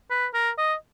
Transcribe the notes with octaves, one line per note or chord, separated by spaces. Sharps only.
B4
A#4
D#5